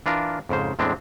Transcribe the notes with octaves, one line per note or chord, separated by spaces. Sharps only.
E3 D4 F4 A#4
F2 G#2 C#3 C5
E2 A2 G#3 C4 D4